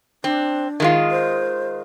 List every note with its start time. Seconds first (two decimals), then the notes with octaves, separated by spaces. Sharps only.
0.24 C4 D4
0.80 D#3 G#3 F4
1.11 C5